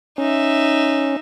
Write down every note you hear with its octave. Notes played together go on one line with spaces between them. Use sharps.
C#4 D#4 E5